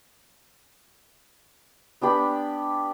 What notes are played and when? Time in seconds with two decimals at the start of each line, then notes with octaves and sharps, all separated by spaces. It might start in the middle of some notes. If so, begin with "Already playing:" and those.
2.01 B3 D4 G4 B5